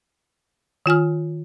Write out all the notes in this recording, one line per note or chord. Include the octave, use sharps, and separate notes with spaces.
D#3 F4 G#5 F6